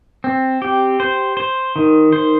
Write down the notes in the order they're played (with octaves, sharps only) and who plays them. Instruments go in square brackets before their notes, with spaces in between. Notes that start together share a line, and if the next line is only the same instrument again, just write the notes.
[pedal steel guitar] C4
G4
C5
C5
D#3
C5